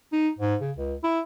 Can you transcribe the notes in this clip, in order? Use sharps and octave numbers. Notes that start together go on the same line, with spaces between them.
D#4
G#2
C#3
C#2
E4